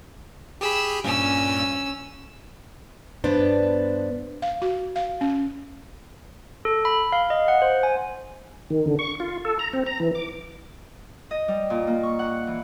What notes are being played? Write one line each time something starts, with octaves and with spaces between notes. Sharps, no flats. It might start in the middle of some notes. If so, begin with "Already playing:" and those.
G4 G#4 B5 E6
G2 A#2 C#4 E6
G2 B3 D4 B4 C5
F5
F#4
F5
C#4
A4
B5
F5
D#5
F#5
C5
G#5
D#3
D3
C#6
F4
A4
A#5
C4
A#5
E3
D6
D#5
G3
A#2
A#3
C#6
F#5
E3